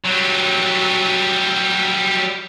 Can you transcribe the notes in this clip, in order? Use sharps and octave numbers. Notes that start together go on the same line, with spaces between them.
F#3 G3